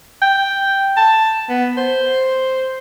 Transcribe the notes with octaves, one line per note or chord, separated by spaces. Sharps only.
G5
A5
B3
C5